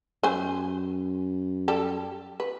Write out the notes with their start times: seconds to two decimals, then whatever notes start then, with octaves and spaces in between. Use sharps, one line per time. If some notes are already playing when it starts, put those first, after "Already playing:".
0.23 F#2 B4 C5 G#5
1.68 G3 G4 A4
2.40 B4